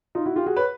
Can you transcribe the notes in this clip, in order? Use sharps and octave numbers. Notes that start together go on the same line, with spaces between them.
D#4 F4
E4 F#4
F4 G4
F#4 G#4
B4 C#5